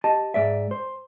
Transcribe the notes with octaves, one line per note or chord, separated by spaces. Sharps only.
G4 D#5 A5
G#2 D5 E5
C5